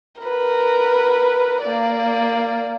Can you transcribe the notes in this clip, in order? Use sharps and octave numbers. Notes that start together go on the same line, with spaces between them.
A#4 B4
A#3 D5